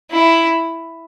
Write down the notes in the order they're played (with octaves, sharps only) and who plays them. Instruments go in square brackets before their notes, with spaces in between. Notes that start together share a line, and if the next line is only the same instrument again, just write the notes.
[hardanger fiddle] E4